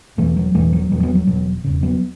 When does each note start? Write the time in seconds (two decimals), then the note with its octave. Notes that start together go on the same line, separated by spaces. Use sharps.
0.17 E1 E2 B2 E3 A3
0.36 F#3
0.54 E1 E2 B2 E3 A3
0.73 F#3
0.91 E1 E2 B2 F#3
1.03 F#3 B3
1.15 F#3
1.27 E1 E2 B2 F#3
1.64 E1 E2 C#3
1.83 F#3 B3